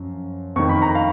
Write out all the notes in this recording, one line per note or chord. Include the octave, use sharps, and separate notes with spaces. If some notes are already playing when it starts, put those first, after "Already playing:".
Already playing: F#2 F3
F2 D#3 C#6
B5
A#5
F5